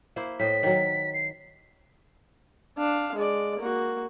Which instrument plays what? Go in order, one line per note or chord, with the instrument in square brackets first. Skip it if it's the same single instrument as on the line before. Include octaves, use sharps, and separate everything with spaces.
[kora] A#3 E4 C5
[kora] A2 C5 D#5 [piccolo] B6
[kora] D#3 F#3
[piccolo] C7
[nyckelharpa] D4 F5
G#3 D5
A#3 F#4